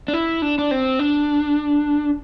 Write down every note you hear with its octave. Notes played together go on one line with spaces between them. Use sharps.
D4
E4
D4
D4
C4
D4